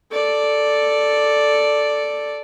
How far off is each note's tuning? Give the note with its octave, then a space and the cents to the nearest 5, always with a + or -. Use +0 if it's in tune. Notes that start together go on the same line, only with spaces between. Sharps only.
A4 +0 D5 +0